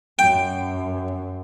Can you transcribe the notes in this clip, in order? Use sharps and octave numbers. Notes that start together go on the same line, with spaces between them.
F#2 G5